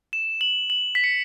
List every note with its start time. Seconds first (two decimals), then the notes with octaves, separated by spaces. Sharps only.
0.13 E7
0.41 F#7
0.70 F#7
0.95 B6
1.04 C#7